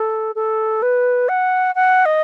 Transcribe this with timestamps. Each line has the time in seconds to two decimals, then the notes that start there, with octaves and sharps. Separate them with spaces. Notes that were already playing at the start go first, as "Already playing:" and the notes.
Already playing: A4
0.35 A4
0.82 B4
1.29 F#5
1.75 F#5
2.05 D#5